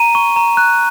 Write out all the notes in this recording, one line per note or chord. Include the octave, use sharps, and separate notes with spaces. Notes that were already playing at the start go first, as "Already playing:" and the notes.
Already playing: A#5 D#7
C#6
A#5
F#6